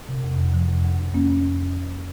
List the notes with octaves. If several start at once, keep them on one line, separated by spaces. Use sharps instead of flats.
C3
F2
F2
F3
F2
F2
F2
A#3 C#4